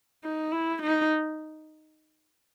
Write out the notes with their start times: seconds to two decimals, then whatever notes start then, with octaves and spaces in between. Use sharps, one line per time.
0.24 D#4
0.52 E4
0.82 D#4